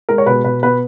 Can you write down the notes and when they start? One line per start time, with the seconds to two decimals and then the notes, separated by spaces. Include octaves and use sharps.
0.09 G#3 A#4
0.18 C#5
0.26 B2 B4
0.45 B2 B4
0.63 B3 B4